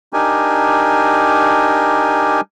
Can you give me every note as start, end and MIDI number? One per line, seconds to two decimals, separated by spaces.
0.13 2.41 62
0.13 2.41 63
0.13 2.41 67
0.13 2.41 70
0.13 2.41 80